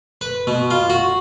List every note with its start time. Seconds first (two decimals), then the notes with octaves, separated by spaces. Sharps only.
0.21 B4
0.47 B2
0.70 F4
0.90 F#4